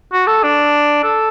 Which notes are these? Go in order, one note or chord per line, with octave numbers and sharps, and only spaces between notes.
F#4
A4
D4
A4